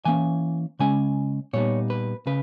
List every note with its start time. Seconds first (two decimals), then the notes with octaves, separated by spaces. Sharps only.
0.05 E3 A#3 C#4 G#5
0.79 C#3 G#3 C#4 G#5
1.53 A#2 G3 B3 D#4 C#5
1.90 B4
2.27 C#3 B4